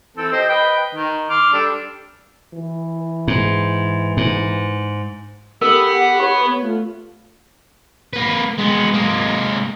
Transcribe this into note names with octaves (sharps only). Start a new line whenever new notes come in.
E3 C4 A4
G4 C5 D#5
B4 D#5 G5
D#3
C6 D6 F6
G3 D4 A4
E3
G#2
G#2
B3 G4 A4 A#4
F#5
G4 B4 C#5
B3
A3 F4
A#3 B4
G#3 B3
G#3 A#3